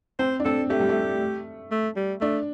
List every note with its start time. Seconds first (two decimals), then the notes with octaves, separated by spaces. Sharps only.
0.19 C4 C5
0.40 D4
0.45 C4 A4
0.70 A3 G4
0.80 G3
0.89 A3
1.71 A3
1.97 G3
2.21 A3 D4